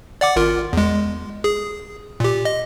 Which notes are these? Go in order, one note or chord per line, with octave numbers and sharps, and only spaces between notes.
D5 F#5 D6
G#1 F4 A#4
E2 G#3
G#4
A#2 G4
D#5